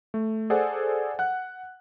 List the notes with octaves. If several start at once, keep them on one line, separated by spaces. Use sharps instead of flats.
A3
G#4 A4 C5 D5 F#5 G#5
F#5 F#6